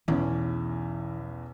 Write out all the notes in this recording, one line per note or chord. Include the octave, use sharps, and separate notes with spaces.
B1 E2 E3 C#4